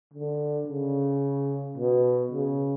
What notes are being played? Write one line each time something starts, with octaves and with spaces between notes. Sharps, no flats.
D3
C#3
B2
C#3